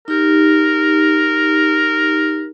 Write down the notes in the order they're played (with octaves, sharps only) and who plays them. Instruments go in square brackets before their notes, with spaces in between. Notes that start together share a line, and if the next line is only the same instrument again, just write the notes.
[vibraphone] D#4 G4 [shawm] A#4